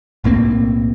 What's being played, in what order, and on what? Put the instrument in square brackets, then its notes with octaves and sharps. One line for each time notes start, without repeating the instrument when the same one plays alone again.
[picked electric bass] B1 A2 A#3 C4